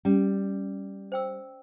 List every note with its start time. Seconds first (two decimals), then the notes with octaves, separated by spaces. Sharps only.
0.05 G3 C#4
1.12 C5 G5 E6